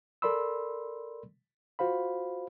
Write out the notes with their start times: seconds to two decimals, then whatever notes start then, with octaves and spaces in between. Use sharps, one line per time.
0.22 A4 A#4 D5 B5 C6 E6
1.79 F4 F#4 C5 F5 B5